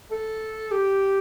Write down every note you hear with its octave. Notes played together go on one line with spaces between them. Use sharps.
A4
G4